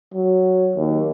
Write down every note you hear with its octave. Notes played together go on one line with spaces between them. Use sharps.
F#3
D#2